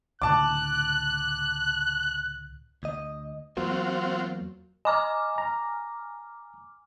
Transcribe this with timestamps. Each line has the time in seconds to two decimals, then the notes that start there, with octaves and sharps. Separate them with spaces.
0.22 C#2 A2 D3 A5 D6 F#6
2.83 D2 D#5
3.57 E2 F#3 A#3 C4 F4 F#4
4.85 D#5 G#5 A#5 D6 F6
5.38 A#5